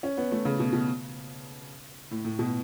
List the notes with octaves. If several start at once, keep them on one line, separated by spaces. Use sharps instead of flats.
C#4
B3
A3
C#3
B2
B2
A2
A2
B2